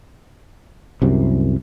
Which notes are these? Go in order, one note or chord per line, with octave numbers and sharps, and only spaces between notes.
C2 F#2 C3